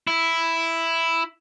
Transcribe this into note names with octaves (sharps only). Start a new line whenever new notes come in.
E4